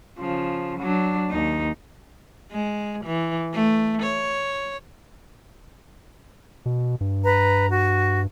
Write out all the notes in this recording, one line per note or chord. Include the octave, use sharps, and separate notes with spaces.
C#3 F3
F#3 D4
D#2 D#4
G#3
E3
A3
C#5
B2
G2
B4 A#5
F#4